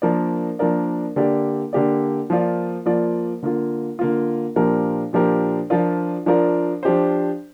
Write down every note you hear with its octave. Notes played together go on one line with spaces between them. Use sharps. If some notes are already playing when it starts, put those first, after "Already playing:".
F3 A#3 D4 A#4 D5
F3 A#3 D4 A#4 D5
D3 A#3 G4 D5
D3 A#3 G4 D5
F3 A#3 F4 D5
F3 A#3 F4 D5
D3 A#3 F4
D3 A#3 F4
A#2 F3 D4 G4 A#4
A#2 F3 D4 G4 A#4
F3 D4 F4 A#4 D5
F3 D4 F4 A#4 D5
F3 D4 G4 C5